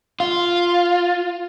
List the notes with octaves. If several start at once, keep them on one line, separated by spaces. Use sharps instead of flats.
F4